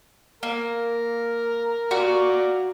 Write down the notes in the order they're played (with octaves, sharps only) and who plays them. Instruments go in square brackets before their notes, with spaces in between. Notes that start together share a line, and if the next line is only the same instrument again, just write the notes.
[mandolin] A#3 [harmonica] A#4
[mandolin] F#4 C#6 [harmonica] D5 F5 A#5